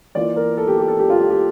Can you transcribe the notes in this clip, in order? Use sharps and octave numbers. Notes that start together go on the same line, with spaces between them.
E3 A#3 F4 D5
A#4
A4
G4
G4
A4
G4
F4
G4
G4